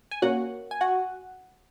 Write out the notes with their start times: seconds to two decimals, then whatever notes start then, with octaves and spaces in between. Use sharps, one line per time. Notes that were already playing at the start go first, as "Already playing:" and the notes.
0.11 G#5
0.22 A#2 A#3 C#4 F#4 F#5
0.71 G#5
0.81 F#4 F#5